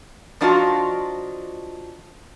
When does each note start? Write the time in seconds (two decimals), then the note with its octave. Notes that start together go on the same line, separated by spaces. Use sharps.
0.41 F3 D4 D#4 F4 F#4